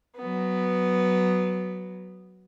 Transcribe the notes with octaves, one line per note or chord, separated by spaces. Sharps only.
F#3 B3